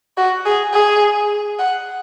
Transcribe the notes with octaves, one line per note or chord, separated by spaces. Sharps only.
F#4
G#4
G#4
F#5